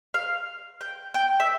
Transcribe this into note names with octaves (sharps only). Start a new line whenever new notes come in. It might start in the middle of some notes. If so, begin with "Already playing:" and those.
F5
G5
G5
E5